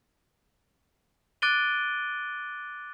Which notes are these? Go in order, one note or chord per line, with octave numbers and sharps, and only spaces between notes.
D6 F#6 A6 D7 D#7 G7